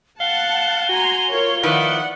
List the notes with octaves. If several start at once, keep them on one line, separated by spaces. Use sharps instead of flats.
F5 F#5 A5 G7
F#4 G#5 A#5 C6
F4 A#4 C#5
D#3 F3 E4 B4 D5 F#5